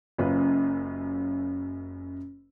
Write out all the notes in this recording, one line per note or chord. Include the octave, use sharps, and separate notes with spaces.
F#1 F#2 C#4 F4 B4